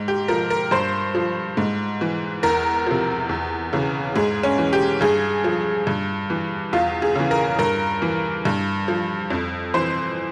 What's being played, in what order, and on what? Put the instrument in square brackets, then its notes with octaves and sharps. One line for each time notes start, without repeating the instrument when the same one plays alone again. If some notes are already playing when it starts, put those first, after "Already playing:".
Already playing: [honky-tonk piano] G#2
G4
F3 A#4
A#4
G2 C5
F3
G#2
E3
E2 A#4
C3 F3
E2
C#3 E3
G#2 G#4
C#4
E3
G4
G2 G#4
F3
G2
E3
E2 F4
G#4
C#3 E3
A#4
G2 A#4
E3
G2
F3
F2
E3 C5